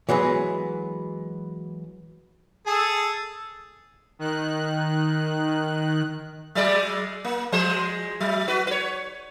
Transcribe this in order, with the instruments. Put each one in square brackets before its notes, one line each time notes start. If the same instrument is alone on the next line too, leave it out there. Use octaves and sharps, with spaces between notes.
[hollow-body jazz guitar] E3 F#3 G#3 B3
[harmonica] G#4 A4 A5
[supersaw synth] D#3 F#6
[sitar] F#3 G#3 D5
A#3
F3 G#3 C5
F#3
F#4 B4
B4 C#5